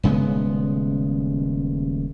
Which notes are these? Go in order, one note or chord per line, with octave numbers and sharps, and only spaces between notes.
D#1 C#3 G#3 B3